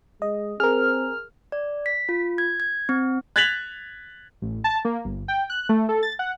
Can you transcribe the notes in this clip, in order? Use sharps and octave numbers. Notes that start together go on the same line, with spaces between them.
G#3 D#5
C4 G#4 A#4 F6
D5
B6
F4
G#6
G#6
C4
F#6 G#6 A6 B6 F7 F#7
A1
A5
A#3
G1
G5
F#6
A3
A4
A6
F#5